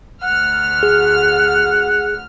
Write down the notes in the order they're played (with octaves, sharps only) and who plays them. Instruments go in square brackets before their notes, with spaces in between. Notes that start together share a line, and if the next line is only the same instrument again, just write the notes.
[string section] D2 F6 [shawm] F#5
[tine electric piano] G#4